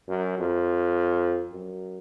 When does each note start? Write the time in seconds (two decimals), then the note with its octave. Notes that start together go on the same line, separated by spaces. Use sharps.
0.08 F#2
0.38 F2
1.52 F#2